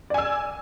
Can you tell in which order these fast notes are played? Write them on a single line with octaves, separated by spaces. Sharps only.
D5 G#5 E6